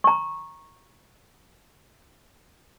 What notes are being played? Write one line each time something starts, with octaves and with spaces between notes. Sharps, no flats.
A#5 C#6